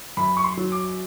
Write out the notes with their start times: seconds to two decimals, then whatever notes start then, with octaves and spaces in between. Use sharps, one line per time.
0.17 F#2 B5
0.37 C#6
0.44 C6
0.57 F#3
0.72 D6